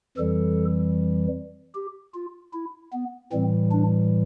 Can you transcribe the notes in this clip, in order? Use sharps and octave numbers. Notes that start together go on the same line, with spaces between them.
F2 E3 G3 A4
G4
F4
E4
B3
A2 E3 G3 C4
D4